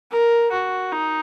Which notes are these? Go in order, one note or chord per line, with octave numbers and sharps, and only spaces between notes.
A#4
F#4
D#4